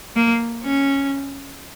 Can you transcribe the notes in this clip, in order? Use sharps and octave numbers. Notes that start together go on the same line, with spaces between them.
A#3
C#4